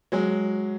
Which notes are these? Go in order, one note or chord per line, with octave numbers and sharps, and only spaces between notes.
F#3 G#3